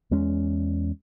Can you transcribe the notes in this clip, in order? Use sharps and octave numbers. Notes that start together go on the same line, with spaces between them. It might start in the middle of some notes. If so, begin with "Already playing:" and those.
E2 G#3 C#4